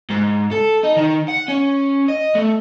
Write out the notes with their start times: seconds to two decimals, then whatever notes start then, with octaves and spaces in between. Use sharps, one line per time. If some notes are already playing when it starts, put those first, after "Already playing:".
0.10 G#2
0.52 A4
0.83 D#4
0.96 D#3
1.28 F#5
1.48 C#4
2.08 D#5
2.35 A3